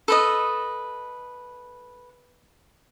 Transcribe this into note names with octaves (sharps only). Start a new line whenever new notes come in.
A4 B4 D#5